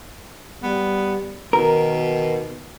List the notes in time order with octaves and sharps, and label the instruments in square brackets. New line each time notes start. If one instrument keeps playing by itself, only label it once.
[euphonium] G3 [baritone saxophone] B3
[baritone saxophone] B2 [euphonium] D#3 [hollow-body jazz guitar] A#4